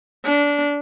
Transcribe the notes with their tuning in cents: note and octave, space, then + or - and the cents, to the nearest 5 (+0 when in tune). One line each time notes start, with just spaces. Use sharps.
D4 -20